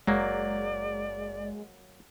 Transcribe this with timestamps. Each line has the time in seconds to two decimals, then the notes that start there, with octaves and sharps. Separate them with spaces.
0.07 F#1 F#3 G#3 A#3 D5